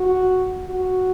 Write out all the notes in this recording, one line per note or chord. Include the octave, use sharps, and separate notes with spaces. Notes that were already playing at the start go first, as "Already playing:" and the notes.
Already playing: F#4
F#4